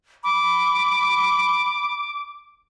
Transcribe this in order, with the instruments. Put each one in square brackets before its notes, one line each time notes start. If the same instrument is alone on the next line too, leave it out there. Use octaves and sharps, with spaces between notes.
[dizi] B5 [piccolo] D6